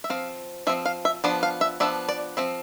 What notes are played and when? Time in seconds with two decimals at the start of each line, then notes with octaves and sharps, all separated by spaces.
0.04 E5
0.10 F3 C4 F5
0.67 F3 C4 E5
0.86 F5
1.05 E5
1.24 F3 B3 D4 D5
1.43 F5
1.61 E5
1.80 F3 B3 D4 E5
2.09 D5
2.37 F3 C4 E5